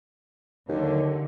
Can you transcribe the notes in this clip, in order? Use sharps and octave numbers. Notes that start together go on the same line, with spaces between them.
D#2 D3 F#3